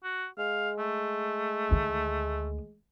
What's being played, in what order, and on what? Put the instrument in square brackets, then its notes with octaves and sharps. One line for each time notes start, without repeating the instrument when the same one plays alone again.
[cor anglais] F#4
[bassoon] G#3 [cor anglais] F5
[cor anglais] A3
[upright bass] D2 D#3